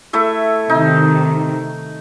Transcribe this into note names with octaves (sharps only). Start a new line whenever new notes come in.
A3 E4 E5
C3 D#3 D#4